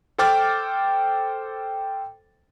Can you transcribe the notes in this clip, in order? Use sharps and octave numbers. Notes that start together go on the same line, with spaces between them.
A4 C5 G5 D6 F6 A6